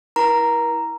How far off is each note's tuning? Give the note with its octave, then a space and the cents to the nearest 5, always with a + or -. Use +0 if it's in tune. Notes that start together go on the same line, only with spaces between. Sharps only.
E4 -20 A#4 +35 A#5 +0